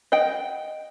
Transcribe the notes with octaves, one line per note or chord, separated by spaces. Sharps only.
D#5 F#5 G5